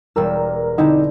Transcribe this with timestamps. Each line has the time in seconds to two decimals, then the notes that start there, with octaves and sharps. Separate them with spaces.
0.16 E1 G3 A#4 E6
0.78 D3 C4 D#4 E4